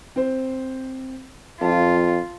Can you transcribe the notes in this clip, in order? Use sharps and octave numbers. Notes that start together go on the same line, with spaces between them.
C4 C5
F2 F4 A5